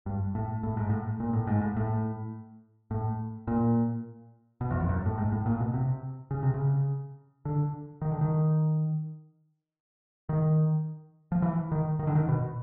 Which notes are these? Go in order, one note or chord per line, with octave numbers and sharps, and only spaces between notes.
G2
A2
A2
G#2
A2
A#2
A2
G#2
A2
A2
A2
A#2
B2
E2
F2
F#2
A2
G#2
A2
A#2
B2
C3
C#3
C3
C#3
D3
D#3
D3
D#3
D#3
F3
E3
D#3
D#3
D3
D#3
B2